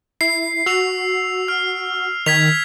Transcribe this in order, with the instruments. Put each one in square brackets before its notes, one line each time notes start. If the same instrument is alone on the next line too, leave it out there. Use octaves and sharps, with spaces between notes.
[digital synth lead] E4 [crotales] C7
[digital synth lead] F#4 [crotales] E6 F7
[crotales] F6
[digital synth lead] D#3 [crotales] G#6 B6 F7